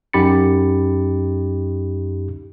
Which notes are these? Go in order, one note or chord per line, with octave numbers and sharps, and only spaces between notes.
F#2 D#4 G4 B5 A6 C#7